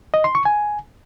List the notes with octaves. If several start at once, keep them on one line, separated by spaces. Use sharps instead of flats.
D#5
C6
C#6
G#5